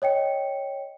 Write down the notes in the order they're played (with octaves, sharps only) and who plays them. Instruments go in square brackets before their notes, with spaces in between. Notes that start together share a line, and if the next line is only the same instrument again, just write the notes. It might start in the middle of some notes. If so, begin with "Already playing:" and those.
[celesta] C#5 D#5 G5 C#7